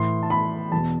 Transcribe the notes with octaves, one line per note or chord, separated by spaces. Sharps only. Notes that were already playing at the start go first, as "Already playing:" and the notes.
Already playing: A2 E3 C6
A5
B5
E2 B2 A5